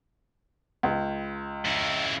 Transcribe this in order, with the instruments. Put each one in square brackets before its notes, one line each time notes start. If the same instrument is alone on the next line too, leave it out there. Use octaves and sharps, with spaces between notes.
[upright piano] C#2
[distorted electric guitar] C#3 E4